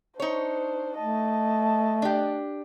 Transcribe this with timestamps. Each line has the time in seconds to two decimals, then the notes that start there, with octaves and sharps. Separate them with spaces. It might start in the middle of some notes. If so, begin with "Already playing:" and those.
0.20 D4 D#4 C5 C#5
0.99 A3 D#5 A5
2.02 D4 G4